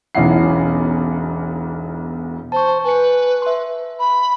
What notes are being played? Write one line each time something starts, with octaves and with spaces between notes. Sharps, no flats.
E1 B1 C#4 E4 F#5 C7
C5 A5 C#6
B4 G#5 C#7
E5 C6
B5